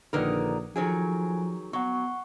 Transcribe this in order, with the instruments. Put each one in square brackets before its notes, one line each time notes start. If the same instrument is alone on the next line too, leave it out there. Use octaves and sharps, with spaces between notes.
[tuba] A#1 [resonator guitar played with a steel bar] D3 D#3 A#4 [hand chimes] B4 D5 D#6
[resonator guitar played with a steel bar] D#3 F#3 G#4 [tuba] F3 [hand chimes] A4 C5 G#5
[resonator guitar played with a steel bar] F#3 [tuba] B3 [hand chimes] F#5 C#6